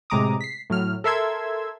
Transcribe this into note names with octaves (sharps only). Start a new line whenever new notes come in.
A2 C3 G#3 A#5 D6 D#6
B6 C7
A2 F#3 F6
A4 A#4 E5 C6 E6 G#6